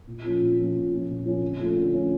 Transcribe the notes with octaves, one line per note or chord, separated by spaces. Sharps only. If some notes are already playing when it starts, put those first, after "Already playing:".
A#2
F3 A#3 C#4 F4
A#2
F3 A#3 C#4 F4
A#2
F3 A#3 C#4 F4
A#2
F3 A#3 C#4 F4
D3
F3 A3 C#4 F4
D3
F3 A3 C#4 F4